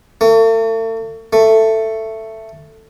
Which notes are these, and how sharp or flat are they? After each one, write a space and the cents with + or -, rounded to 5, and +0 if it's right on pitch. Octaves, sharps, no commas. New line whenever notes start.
A3 +40
A3 +10